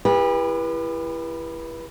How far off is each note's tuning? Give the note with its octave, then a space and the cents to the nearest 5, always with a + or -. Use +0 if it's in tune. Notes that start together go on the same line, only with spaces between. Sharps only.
E4 +25 G4 +40 B4 -30